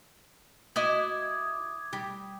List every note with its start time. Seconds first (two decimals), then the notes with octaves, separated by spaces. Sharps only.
0.76 E4 F#4 D#5 D6 D#6 G#6
1.93 G3 G4